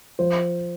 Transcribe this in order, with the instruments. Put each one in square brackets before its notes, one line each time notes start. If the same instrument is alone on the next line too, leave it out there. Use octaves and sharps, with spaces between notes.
[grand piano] F3 C5